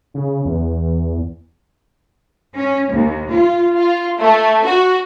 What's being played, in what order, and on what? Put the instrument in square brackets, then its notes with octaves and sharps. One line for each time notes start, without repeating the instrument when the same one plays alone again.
[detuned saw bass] C#3
E2
[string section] C#4
D#2
F4
F4
A3
F#4